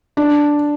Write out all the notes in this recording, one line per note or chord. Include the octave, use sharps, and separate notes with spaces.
D4